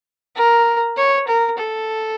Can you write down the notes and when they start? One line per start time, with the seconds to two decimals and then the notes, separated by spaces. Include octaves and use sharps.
0.36 A#4
0.97 C#5
1.28 A#4
1.58 A4